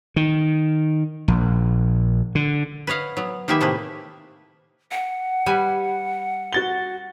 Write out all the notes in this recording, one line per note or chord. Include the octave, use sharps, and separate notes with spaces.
D#3
A#1
D3
B4 C#5 D#5 F5 F#5
F#3 B3
D#3 A#3 G4 G#4 B4 E5
A2 C3 A3 A#3 G#4 B4
F#5
G3 B4 G#5
F#4 A6 G7